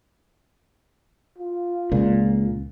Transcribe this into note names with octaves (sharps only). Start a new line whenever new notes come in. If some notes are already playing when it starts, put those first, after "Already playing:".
F4
C#2 A#2